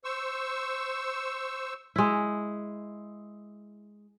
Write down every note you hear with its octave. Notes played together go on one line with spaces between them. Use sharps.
C5 C#6 E6
G#3 E4